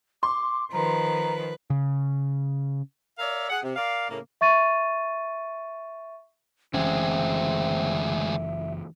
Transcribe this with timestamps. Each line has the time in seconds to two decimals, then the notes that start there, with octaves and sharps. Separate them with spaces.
0.23 C6 D6
0.73 D#3 F3 B4 A#5
1.70 C#3
3.19 A#4 C#5 D5 E5 F5
3.50 G#4 F#5
3.63 C3
3.76 A#4 D5 F5
4.10 A2 C#3 A#3
4.41 E5 C#6 A6 D#7
6.74 F#1 D2 E3 G#3 C4 C#4 E5